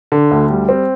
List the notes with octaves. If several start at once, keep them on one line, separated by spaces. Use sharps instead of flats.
D3
D2
G3
C4